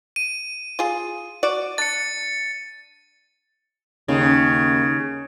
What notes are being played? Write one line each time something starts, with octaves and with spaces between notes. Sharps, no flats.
D#7
F4 G#4
F#4 D5
D4 A6 C#7
D#2 C#3